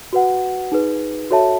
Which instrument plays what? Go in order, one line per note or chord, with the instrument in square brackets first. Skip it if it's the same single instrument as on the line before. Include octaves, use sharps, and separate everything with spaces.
[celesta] F#4 B4 F#5
D#4 G#4 B4
F#4 A4 C#5 E5 A5